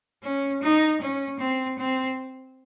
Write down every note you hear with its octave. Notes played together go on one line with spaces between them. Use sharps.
C#4
D#4
C#4
C4
C4